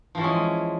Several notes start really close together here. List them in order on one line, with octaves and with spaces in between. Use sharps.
F3 E3 C#4 G#3